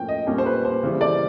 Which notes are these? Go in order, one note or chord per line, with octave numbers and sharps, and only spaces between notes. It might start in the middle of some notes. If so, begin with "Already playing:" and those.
Already playing: A2 F3 A#3 C#4 G5
D#5
A#2 G3 A#3 C#4
C5
B4
C5
C#3 E3 G3 C4
D5